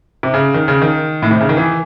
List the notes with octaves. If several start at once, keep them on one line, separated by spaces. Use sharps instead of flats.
C3
C#3
D#3
C#3
D#3
A2
C3
C#3
D#3
E3